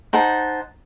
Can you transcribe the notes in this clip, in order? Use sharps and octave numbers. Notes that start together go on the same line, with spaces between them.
D#4 C5 F#5 A5